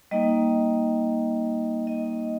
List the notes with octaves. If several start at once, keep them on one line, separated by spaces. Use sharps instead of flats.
G3 A#3 D#4 D#5
D#5